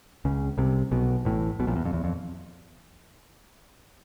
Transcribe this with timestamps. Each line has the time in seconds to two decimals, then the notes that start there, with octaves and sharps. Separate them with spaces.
0.25 C#2 C#3
0.58 C2 C3
0.91 B1 B2
1.25 A1 A2
1.59 B1 B2
1.67 A#1 A#2
1.76 E2
1.85 F2
1.93 E2
2.04 F2